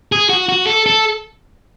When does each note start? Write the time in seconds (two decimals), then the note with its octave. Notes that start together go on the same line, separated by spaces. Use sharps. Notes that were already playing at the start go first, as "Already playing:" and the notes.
0.12 G#4
0.29 F#4
0.49 F#4
0.67 A4
0.86 A4